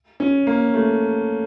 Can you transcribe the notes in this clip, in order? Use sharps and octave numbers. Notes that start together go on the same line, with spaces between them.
C#4
A#3
A3